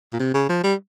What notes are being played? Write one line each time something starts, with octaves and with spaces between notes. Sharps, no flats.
A#2
C3
C#3
F3
G3